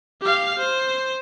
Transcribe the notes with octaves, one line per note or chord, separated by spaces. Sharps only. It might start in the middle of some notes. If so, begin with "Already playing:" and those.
G4 F5
C5